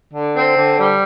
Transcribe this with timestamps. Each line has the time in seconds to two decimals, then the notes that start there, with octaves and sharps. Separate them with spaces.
0.14 D3
0.36 C4
0.56 D3
0.78 G3